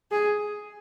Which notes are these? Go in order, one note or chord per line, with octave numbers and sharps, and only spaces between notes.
G#4